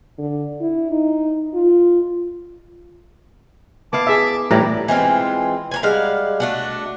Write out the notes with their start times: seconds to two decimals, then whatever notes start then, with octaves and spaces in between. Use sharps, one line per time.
0.18 D3
0.60 E4
0.91 D#4
1.54 F4
3.93 B3 E4 F5 A5 D6
4.07 G#4 E5
4.51 A2 E3 G3 G4 A#5
4.88 E3 G#3 C4 F4
5.71 A#4 C5 G#5
5.83 G3 G#3 F5 F#5
6.40 A3 D4 F#4